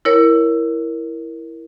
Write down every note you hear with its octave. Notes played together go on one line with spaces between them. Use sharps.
E4 A#4 C#5